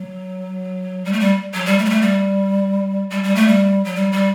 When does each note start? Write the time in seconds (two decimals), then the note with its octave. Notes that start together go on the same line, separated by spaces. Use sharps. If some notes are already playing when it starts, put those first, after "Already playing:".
Already playing: F#3
1.05 G3
1.13 A3
1.20 G3
1.54 F#3
1.66 G3
1.78 A3
1.85 G3
1.90 A3
2.02 G3
3.10 G3
3.23 G3
3.35 A3
3.47 G3
3.84 F#3
3.95 G3
4.12 G3